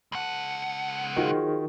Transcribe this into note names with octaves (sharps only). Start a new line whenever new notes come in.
C#2 F#5 A5
D#3 F4 F#4 G#4 C5